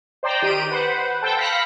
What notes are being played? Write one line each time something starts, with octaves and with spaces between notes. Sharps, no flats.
C5 D5 G5 A#5
D#3 G4 D7 D#7
B4 C5 F#5
A4 C5 G5 A5
F5 B5 A#6 B6 C#7